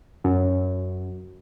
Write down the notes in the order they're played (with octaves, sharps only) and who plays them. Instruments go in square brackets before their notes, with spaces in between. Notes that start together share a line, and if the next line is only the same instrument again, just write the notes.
[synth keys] F#2